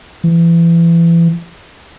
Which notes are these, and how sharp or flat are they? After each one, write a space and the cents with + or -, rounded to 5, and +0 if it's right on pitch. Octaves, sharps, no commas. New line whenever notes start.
E3 +30